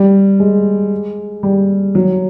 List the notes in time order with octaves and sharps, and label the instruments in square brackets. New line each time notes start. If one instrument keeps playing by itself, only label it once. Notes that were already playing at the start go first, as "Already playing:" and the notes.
Already playing: [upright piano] G3
G#3
G3
F#3